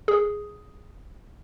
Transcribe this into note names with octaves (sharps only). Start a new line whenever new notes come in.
G#4